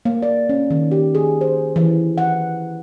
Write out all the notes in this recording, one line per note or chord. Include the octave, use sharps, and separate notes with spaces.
A#3
D5
C#4
D#3
G4
G#4
C5
E3
F#5